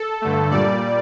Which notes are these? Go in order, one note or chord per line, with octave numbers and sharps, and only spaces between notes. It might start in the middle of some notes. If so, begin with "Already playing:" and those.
Already playing: A4
G2 D3 A3
A#2 G3 D5